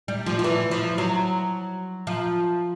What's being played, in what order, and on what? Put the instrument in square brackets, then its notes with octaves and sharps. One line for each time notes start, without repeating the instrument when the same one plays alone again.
[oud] G3
F3
F3
E3
F3
F#3
F3